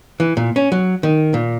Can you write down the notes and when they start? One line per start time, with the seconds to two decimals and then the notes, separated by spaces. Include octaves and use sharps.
0.20 E3
0.37 A#2
0.56 C#4
0.72 F#3
1.03 D#3
1.34 A#2